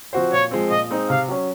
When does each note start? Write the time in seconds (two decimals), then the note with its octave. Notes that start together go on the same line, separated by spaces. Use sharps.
0.13 F3 C4 F#4 C5
0.32 A#2 C#5
0.51 F3 G#3 C4
0.70 A#2 D#5
0.90 G#3 C4 D#4
1.09 C3 F5
1.28 F#3 C#4